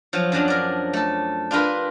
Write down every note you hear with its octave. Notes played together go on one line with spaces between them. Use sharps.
F3 F#3
F#2 F3 F#3 D4
A#4 D5
A3 A4
D4 F4 G4 A#4 B4